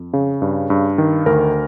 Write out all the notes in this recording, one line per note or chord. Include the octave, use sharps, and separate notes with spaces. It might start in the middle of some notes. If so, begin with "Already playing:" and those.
Already playing: F2
C#3
G2
G2
D#3
D2 A#4